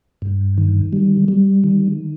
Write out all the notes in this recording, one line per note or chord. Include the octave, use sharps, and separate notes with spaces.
G2
D#3
G3
G3
D#3